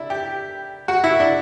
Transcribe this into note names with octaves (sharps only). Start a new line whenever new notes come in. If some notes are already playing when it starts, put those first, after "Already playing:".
Already playing: D4 E4
G4
F#4
E4
D4